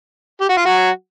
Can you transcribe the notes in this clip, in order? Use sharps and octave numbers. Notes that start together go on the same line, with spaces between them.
G4
F#4
F4
F#3 F#4